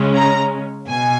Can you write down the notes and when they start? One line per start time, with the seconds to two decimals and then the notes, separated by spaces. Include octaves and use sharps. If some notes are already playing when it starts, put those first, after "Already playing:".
Already playing: C#3 G#3 C#4
0.14 A#5
0.88 B2 G#5